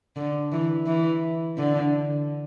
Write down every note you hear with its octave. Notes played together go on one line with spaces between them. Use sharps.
D3
E3
E3
D3